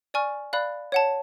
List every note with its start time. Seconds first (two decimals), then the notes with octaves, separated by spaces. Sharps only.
0.14 D5 G#5 C#6 F6
0.53 D5 F5 B5 F#6
0.92 C#5 F#5 A5